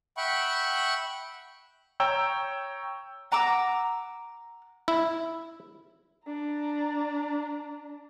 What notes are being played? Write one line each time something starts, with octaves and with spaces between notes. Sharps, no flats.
E5 F#5 G5 B5 C#6
C#5 G5 A#5 E6 G6
F#5 A#5 D6 E6
E4
D4 A#5